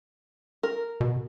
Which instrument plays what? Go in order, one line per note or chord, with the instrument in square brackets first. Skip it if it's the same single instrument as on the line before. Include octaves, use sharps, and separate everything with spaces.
[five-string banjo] A#4
[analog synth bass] B2